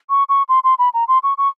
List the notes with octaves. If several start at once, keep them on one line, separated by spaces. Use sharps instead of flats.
C#6
C#6
C6
C6
B5
A#5
C6
C#6
C#6